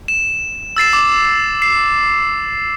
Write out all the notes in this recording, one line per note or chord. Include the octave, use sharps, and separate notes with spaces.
E7
E6 A6 C7 E7
D6
C7